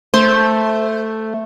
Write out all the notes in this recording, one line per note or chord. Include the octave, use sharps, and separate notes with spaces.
A3 C5